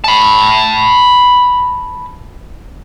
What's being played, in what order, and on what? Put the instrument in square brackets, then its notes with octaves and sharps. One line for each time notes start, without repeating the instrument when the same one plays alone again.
[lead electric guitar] A5 B5